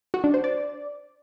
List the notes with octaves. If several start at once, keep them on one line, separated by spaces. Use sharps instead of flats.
F#4
D4
C5
D5